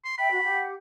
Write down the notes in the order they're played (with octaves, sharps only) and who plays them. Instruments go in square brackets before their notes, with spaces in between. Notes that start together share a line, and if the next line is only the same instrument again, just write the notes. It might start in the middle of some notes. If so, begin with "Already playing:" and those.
[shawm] C6
[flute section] E5 G5 [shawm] B5
[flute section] F#4
G4 F#5